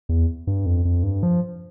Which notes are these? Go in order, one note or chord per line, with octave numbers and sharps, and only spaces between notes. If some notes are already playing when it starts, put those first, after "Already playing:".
E2
G2
F2
F2
G2
F3